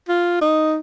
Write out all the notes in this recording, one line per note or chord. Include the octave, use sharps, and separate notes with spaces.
F4
D#4